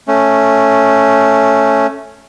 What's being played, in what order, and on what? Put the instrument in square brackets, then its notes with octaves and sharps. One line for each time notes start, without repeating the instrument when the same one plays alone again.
[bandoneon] A3 C#4